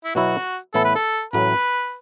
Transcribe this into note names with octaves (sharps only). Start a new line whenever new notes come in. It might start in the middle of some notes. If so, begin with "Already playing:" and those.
E4
B2 F#3 B3 E4 F#4
A2 E3 B3 E4 A4
B4
A4
A1 A2 F#3 A3 B4